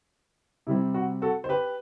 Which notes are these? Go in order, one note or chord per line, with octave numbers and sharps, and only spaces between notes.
C3 G3 C4 E4
F#4
F#4 A4
C5
G4 B4